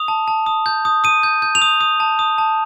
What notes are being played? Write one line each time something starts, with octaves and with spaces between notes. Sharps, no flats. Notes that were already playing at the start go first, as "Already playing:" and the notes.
Already playing: D#6 F7
A5
A5
D#6
G6
D#6
D#6 D#7
G6
G6
F7
D#6
D#6
A5
D#6
A5